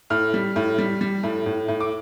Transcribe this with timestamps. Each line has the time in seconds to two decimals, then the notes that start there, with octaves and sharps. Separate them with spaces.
0.10 A2 F6
0.34 G3
0.56 A2
0.78 G3
1.01 G3
1.23 A2
1.46 A2
1.68 A2
1.81 D6